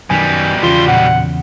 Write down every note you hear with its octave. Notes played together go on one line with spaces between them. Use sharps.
F#2 B2 D#3 G3 G#5
E2 C#3 F4 C6
A#2 F#5